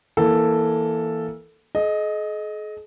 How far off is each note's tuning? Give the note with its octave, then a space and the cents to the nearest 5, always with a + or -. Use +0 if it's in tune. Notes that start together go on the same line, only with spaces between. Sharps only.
E3 +0 A#3 +15 A4 +0
G#4 +45 D#5 +0